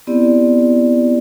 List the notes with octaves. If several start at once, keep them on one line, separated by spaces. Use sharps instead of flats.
B3 C4 E4 G4 D5